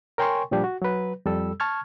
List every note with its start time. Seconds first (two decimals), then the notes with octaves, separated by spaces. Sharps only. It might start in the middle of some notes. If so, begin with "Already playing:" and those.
0.18 A#4 C#5 G5 G#5 C6 C#6
0.51 A#2 F3 G3 D4 G4
0.64 F#4
0.82 F#3 B4
1.26 F2 G3 A4 E6
1.60 A5 C#6 F6 G#6